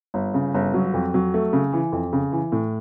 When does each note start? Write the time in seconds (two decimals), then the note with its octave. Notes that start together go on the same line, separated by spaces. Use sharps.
0.14 G1
0.34 C#3
0.54 G1
0.74 F#3
0.94 F2
1.14 F#3
1.34 A3
1.53 C#3
1.73 E3
1.92 F2
2.13 C#3
2.32 E3
2.52 A2